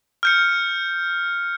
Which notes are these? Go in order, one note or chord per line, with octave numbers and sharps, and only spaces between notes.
F6 G6 C#7